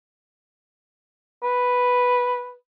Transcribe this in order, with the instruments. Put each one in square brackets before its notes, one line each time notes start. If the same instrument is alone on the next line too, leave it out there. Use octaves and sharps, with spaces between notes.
[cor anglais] B4